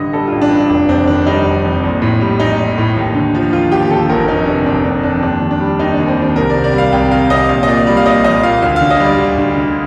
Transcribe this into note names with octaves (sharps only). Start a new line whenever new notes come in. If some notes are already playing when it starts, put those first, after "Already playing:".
Already playing: A1 G2 D3 D#5
G3 A4
A1 F4
D4
G2
F1 D4
F2 C4
D#3 D4
G3 D#4
F1
F2
A#1
A2
G3
A#1 D#4
A#1
A2
D#2
D3
F3
D#2 F4
D#2 G4
D3 A4
G1 A#4
F2 D#4
C3 D4
G1 D4
G1 D4
F2 D4
D#2 D4
D#3
D4
G3
D#2 D#4
D4
D#2
C4
D#3 D4
C2 A#4
C3 D5
D5
G3 F5
C2 G5
C2 F5
C3 D#5
A#1 F5
D#5
A#2 D5
G3 D5
F5
A#1 D#5
A#1 D#5
A#2 F5
D2 F5
D3 F5
D#5
G3 D5
D2
D2
D3